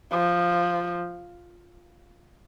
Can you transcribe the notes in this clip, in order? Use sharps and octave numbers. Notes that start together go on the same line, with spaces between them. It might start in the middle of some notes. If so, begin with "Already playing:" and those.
F3